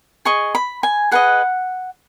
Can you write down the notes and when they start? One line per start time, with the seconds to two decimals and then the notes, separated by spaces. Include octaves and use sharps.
0.25 G#4 D#5 C#6
0.55 B5
0.83 G#5
1.11 G#4 B4 D#5 F#5